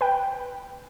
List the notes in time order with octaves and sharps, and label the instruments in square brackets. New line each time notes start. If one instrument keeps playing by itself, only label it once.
[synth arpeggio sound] B4 G5